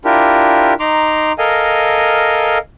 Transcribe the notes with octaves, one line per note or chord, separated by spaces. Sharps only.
D4 E4 F4 G4 A#4
D#4 A#5 C6 D6
A4 A#4 D#5 F5 G#5